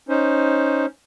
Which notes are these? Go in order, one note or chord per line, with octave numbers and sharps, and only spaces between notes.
C#4 D#4 C5